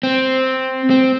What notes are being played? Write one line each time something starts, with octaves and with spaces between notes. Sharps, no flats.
C4
C4